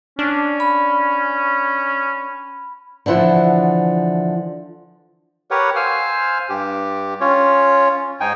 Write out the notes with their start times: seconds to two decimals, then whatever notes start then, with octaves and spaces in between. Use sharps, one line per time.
0.19 C#4 D4
0.60 B5
3.06 D3 E3 F3 E5 F#5
5.51 G4 A#4 B4 C#5 F#5
5.76 C5 F5 G#5 E6 F6
6.49 G2 G4
7.21 C#4 F4 C#5
8.20 G#2 D#4 G5 G#5